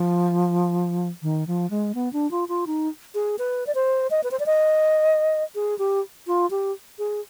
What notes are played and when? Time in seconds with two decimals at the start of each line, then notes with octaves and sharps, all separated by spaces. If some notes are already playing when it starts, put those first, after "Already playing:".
Already playing: F3
1.22 D#3
1.47 F3
1.70 G#3
1.95 B3
2.13 D4
2.31 F4
2.48 F4
2.66 D#4
3.14 G#4
3.38 B4
3.67 D5
3.75 C5
4.11 D#5
4.23 B4
4.31 C5
4.39 D5
4.46 D#5
5.55 G#4
5.78 G4
6.27 F4
6.50 G4
6.98 G#4